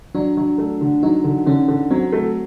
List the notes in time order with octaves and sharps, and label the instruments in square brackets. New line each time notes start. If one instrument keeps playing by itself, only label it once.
[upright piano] F#3 [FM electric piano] D4
[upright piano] F#3
A3
D3
[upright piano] F#3 [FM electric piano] D#4
[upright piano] D3
[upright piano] D3 [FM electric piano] C#4
[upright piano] D3
[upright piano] F#3 [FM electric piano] C4
[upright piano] A3